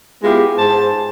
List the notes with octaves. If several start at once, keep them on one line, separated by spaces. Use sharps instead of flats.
G#3 B3 E4 F4 G4
G#2 G#4 C5 A5